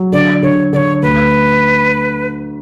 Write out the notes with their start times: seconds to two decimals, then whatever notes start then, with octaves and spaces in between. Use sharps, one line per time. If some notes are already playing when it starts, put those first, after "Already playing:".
Already playing: F#3
0.12 D3 D5
0.43 D3 C#5
0.73 D3 D5
0.77 C#5
1.02 D2 B4